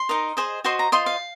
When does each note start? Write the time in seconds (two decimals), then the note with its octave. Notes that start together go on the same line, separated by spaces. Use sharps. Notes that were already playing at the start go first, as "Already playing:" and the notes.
Already playing: C6
0.09 D#4 A#4 D#5
0.37 G#4 C5 D#5
0.64 F#4 C5 D#5 C6
0.79 A#5
0.92 F4 C5 D#5 C6
1.06 F5